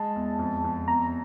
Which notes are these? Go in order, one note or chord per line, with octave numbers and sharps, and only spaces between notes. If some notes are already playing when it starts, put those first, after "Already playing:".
Already playing: G#3 A5
E2
F2
F2
E2 A#5